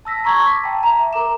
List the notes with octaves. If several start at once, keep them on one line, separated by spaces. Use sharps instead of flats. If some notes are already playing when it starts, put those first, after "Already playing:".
A5 E6 A#6 B6
A5 A#5 C6 C#6 E6 G#6
D6 B6
G5 A5
E5 A#5
A#4 A#5 D6 E7